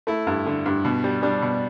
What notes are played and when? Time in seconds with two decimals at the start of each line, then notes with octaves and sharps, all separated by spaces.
0.07 A3 E4
0.27 G2
0.46 D3
0.66 G2
0.85 B2
1.04 G3
1.23 G3 D4
1.42 B2